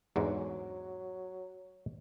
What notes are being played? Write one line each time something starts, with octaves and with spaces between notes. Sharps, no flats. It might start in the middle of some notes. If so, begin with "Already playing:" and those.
E2 G#2 D3 F#3